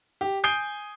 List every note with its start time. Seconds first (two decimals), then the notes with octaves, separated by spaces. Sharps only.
0.21 G4
0.44 G#5 D#6 G6 C7 D7 G7